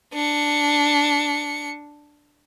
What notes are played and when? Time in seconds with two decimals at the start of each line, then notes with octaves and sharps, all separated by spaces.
0.13 D4 C#7